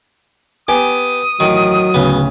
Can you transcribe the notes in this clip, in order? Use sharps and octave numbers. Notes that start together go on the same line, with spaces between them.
B3 G4 G#5 D#6
A1 D#3 F#3
D1 C#3 B3